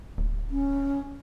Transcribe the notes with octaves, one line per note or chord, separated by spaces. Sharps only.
D1
C#4